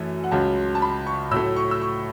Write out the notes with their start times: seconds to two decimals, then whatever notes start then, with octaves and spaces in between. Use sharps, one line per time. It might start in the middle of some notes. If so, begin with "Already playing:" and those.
Already playing: F#2 E3 A3
0.24 F#5
0.31 C#2 C#3 F#3 A5
0.75 A5
0.82 B5
1.07 C#6
1.31 A2 F#3 A3 E6
1.56 C#6
1.71 E6
1.81 C#6